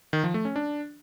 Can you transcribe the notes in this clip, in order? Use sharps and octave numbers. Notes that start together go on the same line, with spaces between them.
D#3
F3
A3
C#4
D4